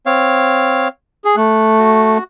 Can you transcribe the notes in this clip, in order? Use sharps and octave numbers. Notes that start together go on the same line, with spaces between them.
C4 C#5 F5
G#4
A3 F#6
F#4